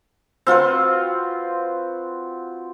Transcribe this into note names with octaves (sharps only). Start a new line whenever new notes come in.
C4 F4 F#4 B4